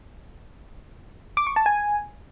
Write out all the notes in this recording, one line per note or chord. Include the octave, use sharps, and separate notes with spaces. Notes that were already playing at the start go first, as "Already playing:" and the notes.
D6
C#6
A5
G#5